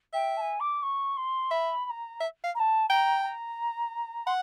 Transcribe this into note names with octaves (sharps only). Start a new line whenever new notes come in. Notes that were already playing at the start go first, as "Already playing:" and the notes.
E5 G5
A5
G#5
D6
C#6
C6
E5 B5
B5
A#5
E5
F5
A#5
A5
G5 A#5
A#5
F#5 C6